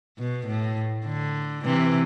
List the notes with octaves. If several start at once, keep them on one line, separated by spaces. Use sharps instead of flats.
B2
A2
D3
C3 E3